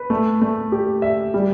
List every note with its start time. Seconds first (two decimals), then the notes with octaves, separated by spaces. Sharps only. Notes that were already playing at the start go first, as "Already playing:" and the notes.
Already playing: B4
0.10 A3
0.42 A3
0.72 G4
1.02 E5
1.34 G3